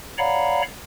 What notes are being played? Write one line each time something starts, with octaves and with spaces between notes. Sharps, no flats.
C#5 D5 F5 F#5 A#5 B5